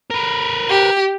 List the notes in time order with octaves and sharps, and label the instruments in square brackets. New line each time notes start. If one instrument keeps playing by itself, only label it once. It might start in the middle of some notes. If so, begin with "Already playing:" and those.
[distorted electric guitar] A#4 B4
[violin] G4